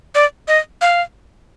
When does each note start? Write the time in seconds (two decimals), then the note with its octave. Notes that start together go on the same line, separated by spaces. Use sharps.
0.15 D5
0.48 D#5
0.81 F5